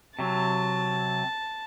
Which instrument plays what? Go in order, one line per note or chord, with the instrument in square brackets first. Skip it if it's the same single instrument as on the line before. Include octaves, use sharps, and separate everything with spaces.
[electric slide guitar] C3 F#3 [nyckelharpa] A5